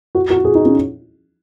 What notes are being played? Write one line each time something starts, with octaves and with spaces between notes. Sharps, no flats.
F#4
F#4
G#4
D#4
C#4